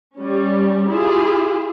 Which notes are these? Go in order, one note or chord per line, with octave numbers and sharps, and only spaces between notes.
G3 C#4
E4 F4 G4 G#4